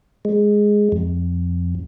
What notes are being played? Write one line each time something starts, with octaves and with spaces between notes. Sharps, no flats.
G#3
F2